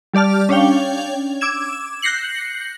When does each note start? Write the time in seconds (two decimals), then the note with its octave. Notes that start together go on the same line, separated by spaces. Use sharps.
0.13 G3 G4 D5 A5 F6
0.49 C#4 D4 C#5 F5 G5 F7
1.41 D6 E6 G#6 E7
2.02 F#6 G6 A#6 C7 C#7 F#7